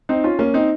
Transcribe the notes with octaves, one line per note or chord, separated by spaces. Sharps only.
C4 D#4
C#4 F4
A#3 C#4
C4 D#4